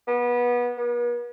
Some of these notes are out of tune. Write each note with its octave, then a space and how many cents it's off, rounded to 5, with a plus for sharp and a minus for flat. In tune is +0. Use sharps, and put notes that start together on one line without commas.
B3 -25
B3 -45